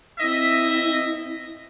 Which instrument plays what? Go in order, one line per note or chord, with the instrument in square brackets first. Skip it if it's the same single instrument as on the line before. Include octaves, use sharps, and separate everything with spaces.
[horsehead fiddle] C4 E4 [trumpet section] D#5 E5